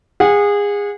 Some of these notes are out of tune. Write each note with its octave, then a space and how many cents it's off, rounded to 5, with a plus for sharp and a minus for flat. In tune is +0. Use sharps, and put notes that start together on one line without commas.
G#4 -25 F#5 -35